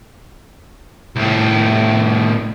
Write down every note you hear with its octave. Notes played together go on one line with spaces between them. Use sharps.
C2 A2